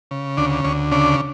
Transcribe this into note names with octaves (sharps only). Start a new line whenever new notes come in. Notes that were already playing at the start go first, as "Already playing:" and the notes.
C#3
D2 D4
D2 C#4
C#3 D4